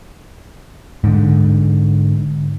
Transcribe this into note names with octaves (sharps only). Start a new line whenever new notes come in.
G#2 D3